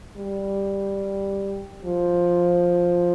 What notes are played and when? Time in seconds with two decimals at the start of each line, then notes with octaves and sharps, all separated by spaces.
0.17 G3
1.84 F3